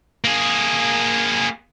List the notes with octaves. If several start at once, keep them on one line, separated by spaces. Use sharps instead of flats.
A#3 G#4